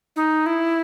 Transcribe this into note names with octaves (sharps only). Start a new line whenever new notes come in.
D#4
E4